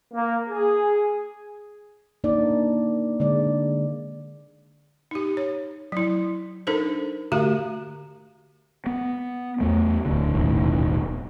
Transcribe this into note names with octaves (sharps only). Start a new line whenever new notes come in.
A#3
G#4
A#3 D4 D#4 D5
D3 G#3 D5
D#4 G4
C#5
F#3 E4
D4 D#4 A4 A#4 C5
D3 A3 F#4 G4 F5 A#5
B3
E2 A3
D1 D2 D3
D#1 B1 A2 D#3